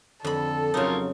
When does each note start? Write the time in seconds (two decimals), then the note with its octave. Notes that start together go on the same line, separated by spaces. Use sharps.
0.24 F2 D3 A4 B5
0.74 C#3 F#3 D#4 F4 A#4 C#5